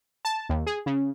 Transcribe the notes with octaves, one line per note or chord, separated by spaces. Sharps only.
A5
D#2
G#4
C#3